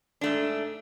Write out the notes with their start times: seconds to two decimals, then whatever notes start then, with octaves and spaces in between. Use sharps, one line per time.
0.21 G#2 A3 D4